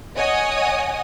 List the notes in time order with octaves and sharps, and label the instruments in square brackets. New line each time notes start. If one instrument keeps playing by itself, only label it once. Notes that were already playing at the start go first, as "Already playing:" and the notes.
[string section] C#5 D#5 F#5 G#5 D#6